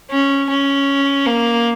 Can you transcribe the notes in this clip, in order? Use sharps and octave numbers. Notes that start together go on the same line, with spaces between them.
C#4
C#4
A#3